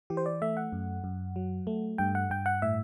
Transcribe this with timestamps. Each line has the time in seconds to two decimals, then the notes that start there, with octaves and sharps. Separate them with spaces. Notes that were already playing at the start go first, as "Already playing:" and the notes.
0.10 E3 G4
0.17 C5
0.26 D5
0.42 A3 E5
0.57 F#5
0.73 F#2
1.04 F#2
1.36 F#3
1.67 A3
1.98 G2 G5
2.15 F#5
2.30 G2 G5
2.46 F#5
2.62 A2 E5